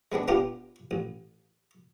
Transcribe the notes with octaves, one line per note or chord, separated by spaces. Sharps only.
G#3 B3 C4 D4
B3 C4 D4 F4 G4 C5
A1